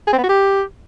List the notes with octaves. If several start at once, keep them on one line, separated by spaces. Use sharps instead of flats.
G#4
C4
B3
F#4
G4